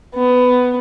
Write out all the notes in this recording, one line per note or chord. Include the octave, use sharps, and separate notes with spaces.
B3